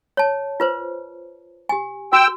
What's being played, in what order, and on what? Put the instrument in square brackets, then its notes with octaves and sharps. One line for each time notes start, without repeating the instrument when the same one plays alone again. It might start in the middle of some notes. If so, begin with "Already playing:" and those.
[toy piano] C#5 A5
F4 B4 C5
G4 G#5
[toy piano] F#4 [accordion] G5 E6